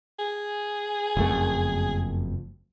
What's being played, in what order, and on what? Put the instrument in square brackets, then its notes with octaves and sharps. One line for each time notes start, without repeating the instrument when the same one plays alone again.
[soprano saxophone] G#4
[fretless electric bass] F#1 F2 A3